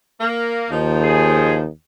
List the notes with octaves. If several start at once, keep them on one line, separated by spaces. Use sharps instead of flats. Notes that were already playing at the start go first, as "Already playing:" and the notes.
A#3
D#2 F3 D#4
G#4